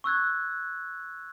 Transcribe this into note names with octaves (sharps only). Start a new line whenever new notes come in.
C#6 E6 F#6 G#6